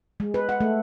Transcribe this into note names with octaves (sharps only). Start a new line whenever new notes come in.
G#3
B4
F#5
A3